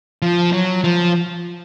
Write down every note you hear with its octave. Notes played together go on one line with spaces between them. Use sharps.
F3
F#3
F3